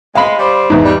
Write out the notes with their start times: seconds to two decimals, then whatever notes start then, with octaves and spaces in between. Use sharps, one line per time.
0.15 G#3 F5 B5
0.39 G3 C5 D5
0.70 E2 G#2
0.84 G3